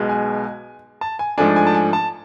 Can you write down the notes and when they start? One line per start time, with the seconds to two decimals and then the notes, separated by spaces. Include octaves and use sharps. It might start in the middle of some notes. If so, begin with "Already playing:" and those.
Already playing: B1 B2 G#3
0.09 G#5
1.01 A5
1.19 G#5
1.38 G#2 F3 A3 D4 G#5
1.56 G#5
1.67 A5
1.74 G#5
1.93 A5